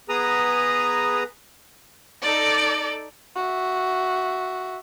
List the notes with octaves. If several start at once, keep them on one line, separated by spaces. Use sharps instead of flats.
B3 G#4 B4 A#5 D#6
D#4 A4 D5
F#4 E5